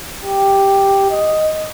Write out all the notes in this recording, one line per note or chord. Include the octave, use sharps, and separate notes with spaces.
G4
D#5